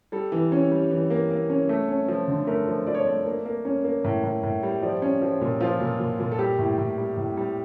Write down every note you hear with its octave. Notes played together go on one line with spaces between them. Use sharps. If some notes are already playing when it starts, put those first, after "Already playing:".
G3 A4
E3
C#4
G3
E3
A#3
A#3
C#4
A3
C#4
F3
D3
A3 A#4
F3
F3 D5
C#5
A3 D5
A#3
A#3
C#4
A#3
A2
A2
A2
G3
F3 D5
C#4
F3
A#2
F3 F4
A#2
A#2
A#2
A4
G3 G4
A2
A2
G3
A2
G3